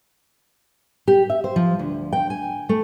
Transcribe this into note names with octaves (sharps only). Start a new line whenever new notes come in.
G4
E5
C5
F3
D2
G5
G#5
A3